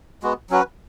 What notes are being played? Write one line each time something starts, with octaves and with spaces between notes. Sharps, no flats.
G#3 B3 F#4
F#3 C#4 F#4 B4